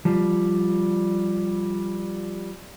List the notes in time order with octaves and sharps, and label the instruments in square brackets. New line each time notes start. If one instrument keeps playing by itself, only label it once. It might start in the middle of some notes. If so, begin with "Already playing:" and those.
[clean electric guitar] F3 G3